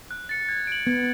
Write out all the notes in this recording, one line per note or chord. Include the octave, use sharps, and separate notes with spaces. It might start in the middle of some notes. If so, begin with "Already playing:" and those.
F#6
A6 C#7
G#6
D7 F#7
B3 G#6